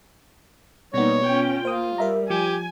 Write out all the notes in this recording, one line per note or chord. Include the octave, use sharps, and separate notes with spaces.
B2 G3 A#3 B3 D#4 C#5
C#4 F4 G5
A#3 F4 C5 D#6
G3 A#4 E5 A#5
F3 G4 G#5